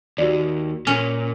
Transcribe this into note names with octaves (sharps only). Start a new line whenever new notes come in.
D#2 F#4 D5
A#2 C#4